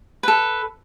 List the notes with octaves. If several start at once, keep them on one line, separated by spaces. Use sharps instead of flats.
A4 B4